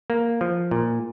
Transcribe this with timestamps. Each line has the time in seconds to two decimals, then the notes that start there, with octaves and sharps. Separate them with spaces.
0.10 A#3
0.41 F3
0.71 A#2